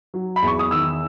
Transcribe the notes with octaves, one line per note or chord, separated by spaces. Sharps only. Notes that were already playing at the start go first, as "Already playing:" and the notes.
F#3
B5
E2 C#6
D#6
D#3 E6